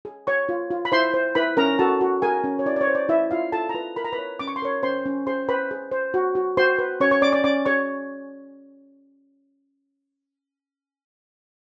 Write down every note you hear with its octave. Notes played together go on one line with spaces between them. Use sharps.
G#4
C#5 C#6
F4
F4
B5
E4 C5 C6
C5
E4 B4 B5
C#4 A#4 A#5
F#4 A4 A5
F#4
G#4 A#4 G#5
C#4
C#5
E4 D5
D5
C#5
C5
D5
E4 E5
E4 F4 F5
F4 A4 A5
A#5
F4 B4 B5
A#4 B5
A#5
B4 B5
C#5
C#4 D6
C#6
C6
A#4 C#5 C#6
C#4 C5 C6
C#4
G#4 C5 C6
B4 C5 B5
G#4
C5
F#4
F#4
F#4 C5 C6
B4
C#4 C#5 C#6
C#5 C#6
C#4 D5 D6
D5 D6
C#4 D5 D6
G#4 C#5 C#6